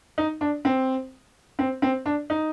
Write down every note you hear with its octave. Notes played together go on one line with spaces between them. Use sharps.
D#4
D4
C4
C4
C4
D4
D#4